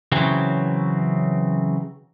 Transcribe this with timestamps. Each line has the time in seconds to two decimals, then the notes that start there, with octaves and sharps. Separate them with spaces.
0.12 C#3 E3 F#3 C4